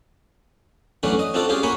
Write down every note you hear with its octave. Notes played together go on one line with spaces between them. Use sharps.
E3 F#3 A3 C#4 D4 F#4
D#5
C4 D4 F4 F#4 A4
C#4 F4 G4 G#4
A#3 F#4 C#5 G#5 B5 C#6